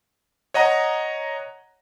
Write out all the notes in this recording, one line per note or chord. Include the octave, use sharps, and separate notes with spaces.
C#5 D#5 F#5 A#5